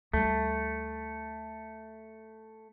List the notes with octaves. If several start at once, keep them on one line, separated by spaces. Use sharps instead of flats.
D2 G3 A3